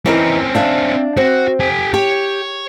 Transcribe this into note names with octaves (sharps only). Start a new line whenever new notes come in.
E3 C4 C#4 D#4 A#4
D4 E5 F5
C4 F#4
G4 G#5
G4 C#5